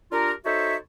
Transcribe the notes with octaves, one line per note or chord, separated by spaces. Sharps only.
D4 F4 G4 A#4
D#4 F#4 A4 C5 C#5 E5